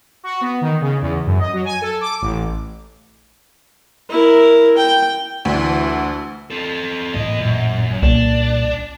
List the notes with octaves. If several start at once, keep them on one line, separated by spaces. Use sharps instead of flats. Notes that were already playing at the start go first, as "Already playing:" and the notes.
F#4
B3
D#3
C#3
E2
F#2
D#5
F#3
G#5
A4
D6
A1
E4 A#4
G5
D2 E3 D4
C4 A4
A1 A#3 D#5
F#2 A#2
C2 A#2 D#3 A#3 D4